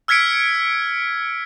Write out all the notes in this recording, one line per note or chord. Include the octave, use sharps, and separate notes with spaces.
E6 F6 G#6 B6 C#7 D7